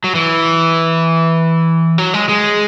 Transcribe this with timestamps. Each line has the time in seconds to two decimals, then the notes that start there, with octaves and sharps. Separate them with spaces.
0.04 F#3
0.15 E3
1.98 F#3
2.14 G#3
2.29 G#3